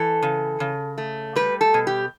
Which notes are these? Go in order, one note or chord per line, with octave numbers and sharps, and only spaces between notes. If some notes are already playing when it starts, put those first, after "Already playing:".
Already playing: E3 A4
C#3
C#3
A3
G3 B4
A4
B2
G4